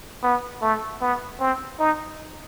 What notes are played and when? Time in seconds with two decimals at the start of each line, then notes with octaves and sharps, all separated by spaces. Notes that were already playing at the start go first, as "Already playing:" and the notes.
0.23 B3
0.62 A3
1.01 B3
1.40 C4
1.79 D#4